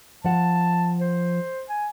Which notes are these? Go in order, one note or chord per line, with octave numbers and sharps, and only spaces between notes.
F3 F#5 A5
C5
G#5